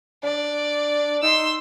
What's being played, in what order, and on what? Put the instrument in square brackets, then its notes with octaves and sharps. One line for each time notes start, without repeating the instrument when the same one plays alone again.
[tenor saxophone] D4 [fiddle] D5
[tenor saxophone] D#4 [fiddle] C6 E6